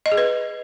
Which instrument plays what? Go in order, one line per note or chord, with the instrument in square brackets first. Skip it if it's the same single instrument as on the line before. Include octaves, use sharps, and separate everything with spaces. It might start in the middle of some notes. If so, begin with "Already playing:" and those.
[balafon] D#5
G#4
B4